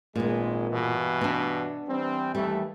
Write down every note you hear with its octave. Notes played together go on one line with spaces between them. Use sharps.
G#1 A#2 G#3 B3
G2 B2 E3
B3 D4
E3 G3 C4
D#2 E3 G3 A3